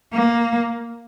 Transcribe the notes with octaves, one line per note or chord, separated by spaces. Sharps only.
A#3